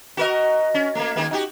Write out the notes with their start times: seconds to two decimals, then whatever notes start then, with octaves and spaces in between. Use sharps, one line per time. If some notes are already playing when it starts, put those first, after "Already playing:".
0.17 F#4 A#4 D#5
0.74 C#4
0.95 A3 A#3
1.16 D#3 G#3 A#3
1.31 D#4 F#4 G4